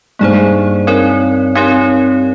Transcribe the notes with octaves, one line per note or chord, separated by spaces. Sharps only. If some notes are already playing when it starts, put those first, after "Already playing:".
G2 A#3 D#4 G#4 C5
C4 D#4 A#4 C#5
C4 D#4 G4 A#4 C#5